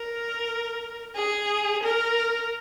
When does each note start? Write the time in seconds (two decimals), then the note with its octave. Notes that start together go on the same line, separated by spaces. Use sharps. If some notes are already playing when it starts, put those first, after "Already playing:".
Already playing: A#4
1.16 G#4
1.83 A#4